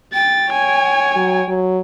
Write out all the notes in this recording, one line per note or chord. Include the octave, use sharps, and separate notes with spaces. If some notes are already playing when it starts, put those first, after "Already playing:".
G5 A6
C#5 G#5
F#3
F#3